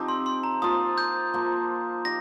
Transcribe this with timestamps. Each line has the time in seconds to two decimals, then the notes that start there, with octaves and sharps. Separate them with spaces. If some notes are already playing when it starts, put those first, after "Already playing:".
Already playing: F3 C4 D#4 G4
0.08 C6
0.26 C6
0.44 A#5
0.62 F3 A#3 F4 D#6
0.98 G6
1.34 F3 A#3 F4
2.05 D#4 G4 A#6